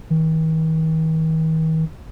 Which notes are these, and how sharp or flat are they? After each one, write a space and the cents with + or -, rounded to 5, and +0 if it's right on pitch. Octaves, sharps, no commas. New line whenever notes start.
D#3 +45